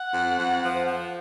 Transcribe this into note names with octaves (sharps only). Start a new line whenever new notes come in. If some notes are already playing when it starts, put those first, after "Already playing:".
Already playing: F#5
F2
F2
F3
F3